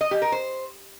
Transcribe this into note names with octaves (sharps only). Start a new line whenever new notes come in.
D#5
G4
A#4
C5